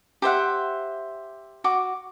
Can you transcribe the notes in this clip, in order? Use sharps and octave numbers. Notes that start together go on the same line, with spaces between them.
G4 C5 E5 F#5
F#4 D6